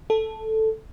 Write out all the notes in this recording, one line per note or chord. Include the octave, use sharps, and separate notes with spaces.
A4